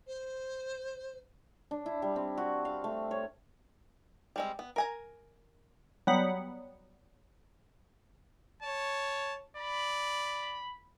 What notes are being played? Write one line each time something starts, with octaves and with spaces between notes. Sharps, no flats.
C5
D4
E4
G3
C4
F#4
F5
A3
C#5
G3 G#3 C4
B3
A#4 G#5 A#5
F#3 G3 B3 F#5
C#5 A5
D5 B5